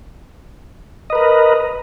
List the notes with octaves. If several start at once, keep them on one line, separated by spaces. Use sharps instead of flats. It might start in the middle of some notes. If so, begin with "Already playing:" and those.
A#4 B4 D#5